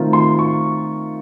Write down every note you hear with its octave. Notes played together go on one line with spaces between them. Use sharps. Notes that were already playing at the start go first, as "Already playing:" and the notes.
Already playing: D#3 A3 C4 F4
C6
C#6